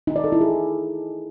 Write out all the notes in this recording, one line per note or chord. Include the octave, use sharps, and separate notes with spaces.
D#4
D5
A4
E4
G#4